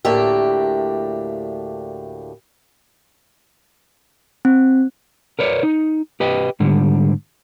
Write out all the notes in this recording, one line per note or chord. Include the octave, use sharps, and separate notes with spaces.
D2 A2 A#3 D4 G4 E5
C4
A#4 B4 C#5 D5
D#4
G4 B4 D#5 G5
G#2 D3 G3